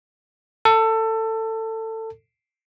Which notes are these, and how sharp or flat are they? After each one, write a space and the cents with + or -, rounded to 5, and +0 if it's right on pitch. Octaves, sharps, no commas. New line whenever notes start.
A4 +20